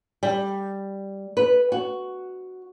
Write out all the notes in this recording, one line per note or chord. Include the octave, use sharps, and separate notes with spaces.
G3
B4
F#4